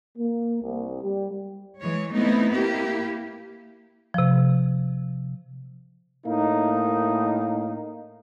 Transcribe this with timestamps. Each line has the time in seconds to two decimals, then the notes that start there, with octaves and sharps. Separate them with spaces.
0.17 A#3
0.62 C2
1.02 G3
1.82 E3 G#3 C#5
2.12 A3 B3 C4 D#4 E4
2.54 A#3 E4 G4
4.14 C3 F3
6.26 A2 A#3 D#4